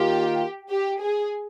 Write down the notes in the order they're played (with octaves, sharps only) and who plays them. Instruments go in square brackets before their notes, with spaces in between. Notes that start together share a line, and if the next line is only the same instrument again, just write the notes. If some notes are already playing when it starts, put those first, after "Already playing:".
Already playing: [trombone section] D#3 A#3 F4 [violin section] G4
[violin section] G4
G#4